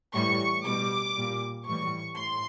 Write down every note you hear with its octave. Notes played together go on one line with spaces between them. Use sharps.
A2 E3 G3 C#6
B2 G3 D6
A#2 G3
A2 E3 G3 C#6
A2 C6